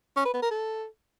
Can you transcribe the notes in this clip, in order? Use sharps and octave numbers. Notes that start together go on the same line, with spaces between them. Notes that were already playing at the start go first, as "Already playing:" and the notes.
C#4
B4
B3
A#4
A4